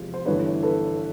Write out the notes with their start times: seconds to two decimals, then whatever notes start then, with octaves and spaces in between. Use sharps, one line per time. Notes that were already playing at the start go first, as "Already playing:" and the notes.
Already playing: E2 C3 F3 G#3
0.14 C5
0.25 G1 G2 E3 A3 B4 C#5
0.63 A4 B4